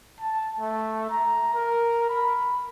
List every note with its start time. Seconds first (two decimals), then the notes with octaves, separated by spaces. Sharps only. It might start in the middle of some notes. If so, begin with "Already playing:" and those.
0.20 A5
0.59 A3
1.10 A#5
1.54 A#4
2.09 B5